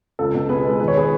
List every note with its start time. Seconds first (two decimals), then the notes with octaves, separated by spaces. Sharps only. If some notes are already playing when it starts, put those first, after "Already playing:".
0.19 C#2 A4
0.34 B2
0.49 B3 G#4 B4
0.65 G#3
0.79 D#3 B4
0.88 C#5
0.97 G#4 B4